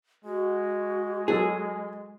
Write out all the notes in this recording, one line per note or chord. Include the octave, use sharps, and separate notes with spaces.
G#3 F#4
F#3 G#4 A4